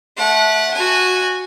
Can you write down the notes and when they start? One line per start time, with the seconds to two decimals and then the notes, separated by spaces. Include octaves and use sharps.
0.17 A3 F#5
0.74 F#4 G#5